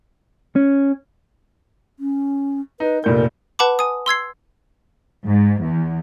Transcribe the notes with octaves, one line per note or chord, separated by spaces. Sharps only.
C#4
C#4
D#4 B4
F1 A#2 A#4 G6
B4 F#5 A5 B5 D6
G#5 D#6
C6 E6 G#6 C7
G#2
E2